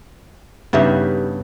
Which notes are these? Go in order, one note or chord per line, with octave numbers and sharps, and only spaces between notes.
G2 C#3 B3 D#4 G4 E5